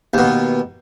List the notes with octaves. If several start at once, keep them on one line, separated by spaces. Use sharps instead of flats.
D#2 B2